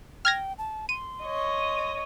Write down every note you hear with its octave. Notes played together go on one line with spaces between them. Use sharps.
G5 F6 G#6 A#6
A5
C6 D#7
C#5 D#5